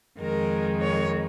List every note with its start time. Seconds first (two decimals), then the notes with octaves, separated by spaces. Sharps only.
0.21 F2 D#3 G#3 A#4
0.82 C#5